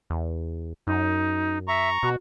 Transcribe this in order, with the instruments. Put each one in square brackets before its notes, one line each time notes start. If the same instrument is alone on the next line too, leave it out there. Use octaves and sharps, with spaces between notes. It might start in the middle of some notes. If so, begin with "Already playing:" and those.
[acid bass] E2
[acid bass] F#2 [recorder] D#4
[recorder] E5 [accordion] A#5 C#6
[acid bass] B2 [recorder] F#4